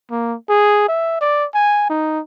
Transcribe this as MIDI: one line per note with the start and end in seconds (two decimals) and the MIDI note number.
0.11 0.35 58
0.49 0.84 68
0.88 1.19 76
1.21 1.46 74
1.54 1.86 80
1.90 2.20 63